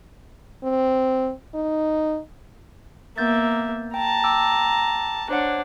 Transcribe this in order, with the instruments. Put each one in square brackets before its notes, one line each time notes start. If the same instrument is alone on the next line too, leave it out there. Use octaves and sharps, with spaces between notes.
[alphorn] C4
D#4
[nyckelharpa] A#3 E5 [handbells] B3 G6 A6
[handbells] G5 [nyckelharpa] A5 A#5
[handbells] G5 D6 E6
[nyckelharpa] D4 [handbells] C5 C#5 F#5